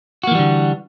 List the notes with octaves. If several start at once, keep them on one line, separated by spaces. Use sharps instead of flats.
D3 E3 G3 A#3 F#4